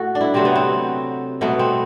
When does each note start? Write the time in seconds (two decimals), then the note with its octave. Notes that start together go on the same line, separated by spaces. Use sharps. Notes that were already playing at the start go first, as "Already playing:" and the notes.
Already playing: A2 A3 F#4 A4
0.15 D4
0.21 E4
0.34 C3 F#3 A3 C4
0.45 B3
0.56 C4
1.41 B2 F#3 A3 B3
1.59 C4